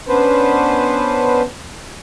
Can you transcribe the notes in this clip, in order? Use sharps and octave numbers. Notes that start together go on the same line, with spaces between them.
B3 C#4 D4 B4 C5